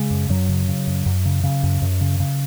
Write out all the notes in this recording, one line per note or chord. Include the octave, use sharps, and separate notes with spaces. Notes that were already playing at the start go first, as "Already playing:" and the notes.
Already playing: C#3 G#3
F#2
F#2 F#3
C#3
C#3
F#2
F#2
C#3
C#3
F#2
F#2
C#3
C#3